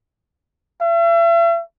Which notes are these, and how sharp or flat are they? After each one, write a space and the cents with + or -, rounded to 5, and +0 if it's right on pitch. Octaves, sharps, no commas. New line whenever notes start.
E5 +40